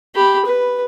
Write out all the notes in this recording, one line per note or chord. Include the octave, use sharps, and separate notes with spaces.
G4 B5
B4